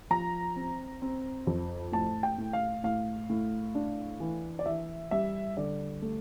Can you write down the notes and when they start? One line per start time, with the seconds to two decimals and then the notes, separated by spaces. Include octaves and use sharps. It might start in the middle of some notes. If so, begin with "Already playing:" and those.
0.11 F3 A#5
0.56 C4
1.02 C4
1.47 F2
1.92 A2 A5
2.23 G5
2.38 A2
2.53 F5
2.84 A2 F5
3.30 A2
3.75 D4
4.20 E3
4.59 D5
4.66 E3 E5
5.11 G3 E5
5.57 D3 D5
6.02 A3